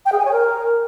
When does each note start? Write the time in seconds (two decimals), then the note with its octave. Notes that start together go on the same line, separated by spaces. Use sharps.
0.05 G5
0.12 G#4
0.18 G#5
0.25 C#5
0.31 A#4